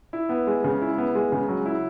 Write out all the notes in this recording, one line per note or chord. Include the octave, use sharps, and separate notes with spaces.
E4
B3
G#3
C#3
E4
B3
G#3
C#3
F#3
E4